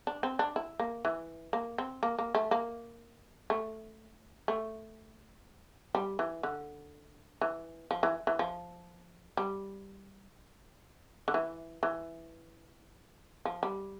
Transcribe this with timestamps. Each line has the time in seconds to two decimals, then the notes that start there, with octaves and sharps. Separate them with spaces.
0.07 D4
0.23 C4
0.39 D4
0.56 E4
0.79 A#3
1.05 E3
1.53 A#3
1.78 C4
2.03 A#3
2.19 A#3
2.35 A3
2.51 A#3
3.50 A3
4.48 A3
5.95 G3
6.19 E3
6.43 D3
7.41 E3
7.91 F3
8.03 E3
8.27 E3
8.39 F3
9.37 G3
11.28 D3
11.34 E3
11.83 E3
13.45 F3
13.63 G3